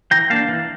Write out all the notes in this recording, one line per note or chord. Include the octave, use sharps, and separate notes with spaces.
E3 G5 A#5
A#3 D4 F5 A5
E3